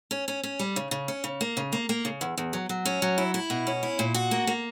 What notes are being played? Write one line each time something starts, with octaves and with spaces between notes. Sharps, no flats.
C#4
C#4
C#4
G3
C#3
C#3
C#4
C#3
A#3
C#3
A#3
A#3
C#3
E2
E2
F#3
F#3
C#4
F#3
E4
E4
B2
C#4
E4
A#2
F#4
A#3
A#3